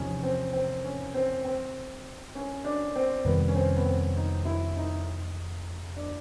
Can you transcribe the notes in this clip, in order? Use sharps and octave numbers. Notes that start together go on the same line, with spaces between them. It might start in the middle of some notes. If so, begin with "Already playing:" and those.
Already playing: E2 C3 F3 C#4 D#4
C4
C4
C#4
C4
C4
C#4
D4
C4
F2 C3 D#3 G3 B3
C#4
C4
B3
C4
D#4
E4
D#4
D4